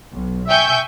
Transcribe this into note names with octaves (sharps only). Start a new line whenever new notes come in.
B1
E5 G5 G#5 C#6 G6